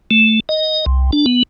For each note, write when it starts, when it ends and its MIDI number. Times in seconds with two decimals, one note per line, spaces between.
0.11 0.40 57
0.49 0.85 75
0.86 1.11 36
1.13 1.26 62
1.26 1.43 59